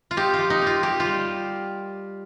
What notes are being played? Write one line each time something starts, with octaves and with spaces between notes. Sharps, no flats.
F4
D#4 G4
F4
F3
D#4
A#3
F4
D#4 G4
F4
G3